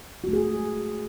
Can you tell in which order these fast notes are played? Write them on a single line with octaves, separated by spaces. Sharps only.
F#4 A3 G#4